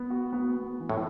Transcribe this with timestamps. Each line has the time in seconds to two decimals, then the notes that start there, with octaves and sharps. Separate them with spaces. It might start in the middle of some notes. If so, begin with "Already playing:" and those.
Already playing: B3
0.10 F#4
0.33 B3
0.56 B3
0.80 E3
0.89 A2